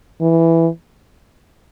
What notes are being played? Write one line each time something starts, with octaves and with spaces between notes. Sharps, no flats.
E3